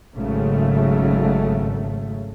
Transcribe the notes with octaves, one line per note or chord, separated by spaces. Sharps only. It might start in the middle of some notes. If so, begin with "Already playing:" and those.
G#1 C#3 F#3 A3